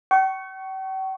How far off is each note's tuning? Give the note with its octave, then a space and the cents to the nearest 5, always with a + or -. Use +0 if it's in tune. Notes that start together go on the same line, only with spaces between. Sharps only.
G5 -45 C#6 +0